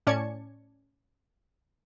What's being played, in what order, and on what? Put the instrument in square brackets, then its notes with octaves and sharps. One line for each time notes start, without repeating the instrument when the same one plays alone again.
[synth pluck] A2 C#4 D5 A5 G#6 C#7